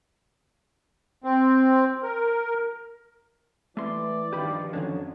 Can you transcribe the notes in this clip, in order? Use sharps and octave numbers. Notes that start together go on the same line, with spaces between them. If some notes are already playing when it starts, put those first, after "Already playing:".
C4
A#4
E3 A3 D5 C6
G2 D#3 F3 G4 B5
F2 D3 F3 F#3 C#4